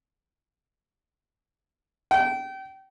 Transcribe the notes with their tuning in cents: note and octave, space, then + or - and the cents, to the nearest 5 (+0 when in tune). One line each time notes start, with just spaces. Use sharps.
G5 -30